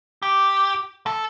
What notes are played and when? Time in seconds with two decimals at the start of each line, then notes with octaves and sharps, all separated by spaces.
0.23 G4
1.06 A4